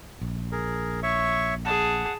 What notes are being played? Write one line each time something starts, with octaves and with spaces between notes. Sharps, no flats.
A#1
G#4 A#4
C#5 E5 C#6
G#4 F#5 A5